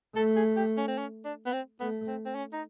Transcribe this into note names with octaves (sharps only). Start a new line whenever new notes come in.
A3 A4
G#4
G4
C#4
C4
C#4
D4
B3
C4
A3 B3
C4
C4
C#4
D#4